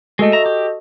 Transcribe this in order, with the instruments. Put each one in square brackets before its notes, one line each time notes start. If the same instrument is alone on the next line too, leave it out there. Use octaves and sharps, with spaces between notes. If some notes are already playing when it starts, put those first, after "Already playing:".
[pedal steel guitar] G#3 A3 [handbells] F#4 A4 D#5
[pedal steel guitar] E5 A#5
G4